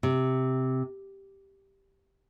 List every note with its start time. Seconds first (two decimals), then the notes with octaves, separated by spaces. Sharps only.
0.03 C3